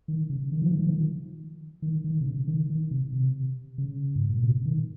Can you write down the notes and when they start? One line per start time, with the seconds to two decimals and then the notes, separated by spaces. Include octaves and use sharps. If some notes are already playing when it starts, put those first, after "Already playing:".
0.08 D#3
0.30 C#3
0.52 D#3
0.62 F3
0.71 D#3
0.80 F3
0.90 D#3
1.82 D#3
2.04 D#3
2.21 C3
2.27 C#3
2.47 D#3
2.70 D#3
2.91 C3
3.13 C3
3.78 C#3
4.16 G#2
4.30 A#2
4.44 C3
4.65 D#3